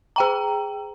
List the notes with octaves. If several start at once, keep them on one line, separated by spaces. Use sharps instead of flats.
G#4 G5 A#5